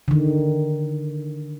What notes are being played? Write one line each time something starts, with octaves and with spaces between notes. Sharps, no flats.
D3 D#3